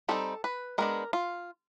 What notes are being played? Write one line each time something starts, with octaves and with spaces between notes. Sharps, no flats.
G3 C4 D#4 A4
B4
G#3 B3 D4 A#4
F4